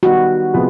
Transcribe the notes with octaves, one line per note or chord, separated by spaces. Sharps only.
D#3 G3 B3 D#4 F#4
C3 F3 G#3 B3